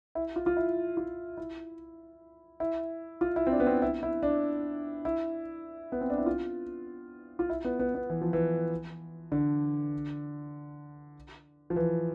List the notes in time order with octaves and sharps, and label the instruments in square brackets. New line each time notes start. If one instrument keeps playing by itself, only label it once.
[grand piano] E4
F4
F4
E4
F4
E4
E4
F4
E4
C4
D4
B3
C4
E4
E4
D4
E4
B3
C4
D4
E4
F4
F4
E4
B3
B3
B3
E3
F3
E3
D3
F3
E3